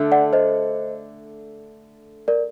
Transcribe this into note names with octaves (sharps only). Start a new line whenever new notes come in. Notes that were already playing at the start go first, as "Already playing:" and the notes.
Already playing: D3 A3 D4 A4
D5 F#5
C5 D#5
A#4 D5